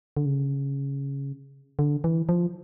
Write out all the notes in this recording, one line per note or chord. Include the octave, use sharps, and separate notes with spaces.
D3
C#3
D3
E3
F3